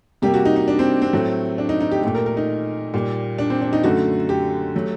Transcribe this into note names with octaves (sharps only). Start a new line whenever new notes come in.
C3 G3 A#3 G4
F#4
D#4
D#4
D4
C4
C4
A2 F#3 A3
D4
D#4
D#4
G4
A#2 A3 G4
A#4
A#4
D#4
A#2 G3 A#3
D4
C4
D4
D#4
F#2 D3 A3 F#4
G4
F#3 A3